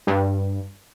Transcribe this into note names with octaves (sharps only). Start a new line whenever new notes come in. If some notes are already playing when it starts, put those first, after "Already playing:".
G2